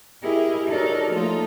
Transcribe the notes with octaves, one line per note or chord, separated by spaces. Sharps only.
E4 G4 G#4 A#4 D#5
D#4 F#4 A4 A#4 C#5 D5
F3 A3 A#3 D#4 F4 A4